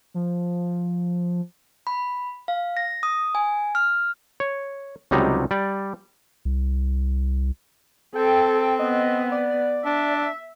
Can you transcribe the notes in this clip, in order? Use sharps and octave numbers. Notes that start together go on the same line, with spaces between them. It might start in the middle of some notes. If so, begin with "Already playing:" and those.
F3
B5
F5
A#6
D#6
G#5
F6
C#5
C#2 C3 F#3 G3 D#4 A#5
G3 D5
C2
C4 A4 G5
B3 D#5
D5
D4 E5